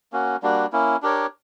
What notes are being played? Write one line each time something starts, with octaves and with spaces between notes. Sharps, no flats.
A#3 C#4 F#4
G3 A#3 D4 F#4
A#3 C#4 E4
D4 G4 A#4 C#5